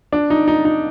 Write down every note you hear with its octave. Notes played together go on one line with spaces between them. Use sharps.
D4
D#4
D#4
D#4